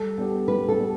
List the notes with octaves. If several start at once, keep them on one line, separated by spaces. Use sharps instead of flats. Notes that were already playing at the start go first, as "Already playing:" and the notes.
Already playing: G3 A4
B3 D4 G4
G3 B4
A4
B3 D4 G4